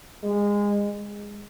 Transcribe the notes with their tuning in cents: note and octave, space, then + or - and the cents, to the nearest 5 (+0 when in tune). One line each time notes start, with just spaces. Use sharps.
G#3 -25
G#3 -15